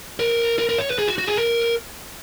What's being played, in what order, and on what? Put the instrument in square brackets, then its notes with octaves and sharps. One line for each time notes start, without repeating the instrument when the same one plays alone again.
[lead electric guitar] A#4
A#4
A#4
C#5
B4
G#4
F#4
F#4
G#4
A#4